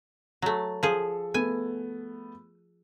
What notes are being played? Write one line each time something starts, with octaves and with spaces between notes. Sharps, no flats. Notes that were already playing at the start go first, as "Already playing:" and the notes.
F#3 A3
F3 G#4 A4
A3 B3 G#5